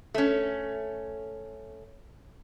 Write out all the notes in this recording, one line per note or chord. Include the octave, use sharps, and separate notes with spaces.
A3 C#4